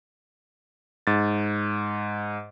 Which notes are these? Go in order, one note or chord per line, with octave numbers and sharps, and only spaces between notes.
G#2 A6